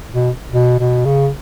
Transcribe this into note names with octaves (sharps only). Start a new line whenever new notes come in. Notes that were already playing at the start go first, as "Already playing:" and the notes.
B2
B2
B2
C#3